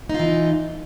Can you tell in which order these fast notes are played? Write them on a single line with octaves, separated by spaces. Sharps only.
D#4 F4 E3